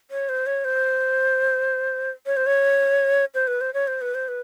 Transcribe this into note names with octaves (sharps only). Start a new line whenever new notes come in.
C#5
C5
C#5
C5
C#5
C5
C#5
C5
B4
C5
C#5
C5
B4
C5
B4